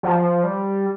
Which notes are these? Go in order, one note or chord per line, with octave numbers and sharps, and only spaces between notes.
F3
G3